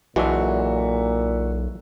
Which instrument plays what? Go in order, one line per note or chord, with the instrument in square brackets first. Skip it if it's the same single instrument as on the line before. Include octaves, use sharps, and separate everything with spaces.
[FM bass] B1 [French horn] A#2 [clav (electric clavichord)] E3 G#3 D4 [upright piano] F#4 E5